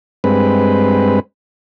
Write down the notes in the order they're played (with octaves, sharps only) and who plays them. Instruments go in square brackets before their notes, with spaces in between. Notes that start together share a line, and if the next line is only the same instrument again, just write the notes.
[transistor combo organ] G2 G#3 C4 B4